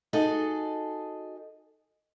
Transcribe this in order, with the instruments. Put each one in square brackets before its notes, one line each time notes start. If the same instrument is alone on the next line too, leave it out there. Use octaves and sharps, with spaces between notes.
[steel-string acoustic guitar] D#4 F#4 G#4 A4 D#5